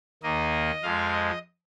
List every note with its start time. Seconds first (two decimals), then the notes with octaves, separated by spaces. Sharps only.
0.23 D#2 D#3 A#3 D#5
0.83 F2 F3 G#3 F5
1.13 D#5